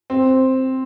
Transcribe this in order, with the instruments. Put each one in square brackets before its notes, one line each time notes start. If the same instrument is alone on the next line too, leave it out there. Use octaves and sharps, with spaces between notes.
[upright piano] C4